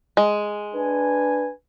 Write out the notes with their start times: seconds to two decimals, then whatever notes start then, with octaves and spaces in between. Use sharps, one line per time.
0.17 G#3
0.74 D4 B4 G#5